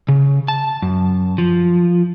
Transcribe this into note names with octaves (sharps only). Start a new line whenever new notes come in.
C#3
A5
F#2
F3